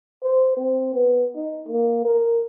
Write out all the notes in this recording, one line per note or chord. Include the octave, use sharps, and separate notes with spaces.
C5
C4
B3
D#4
A#3
A#4